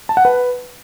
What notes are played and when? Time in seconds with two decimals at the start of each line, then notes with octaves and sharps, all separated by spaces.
0.09 A5
0.17 F#5
0.25 B4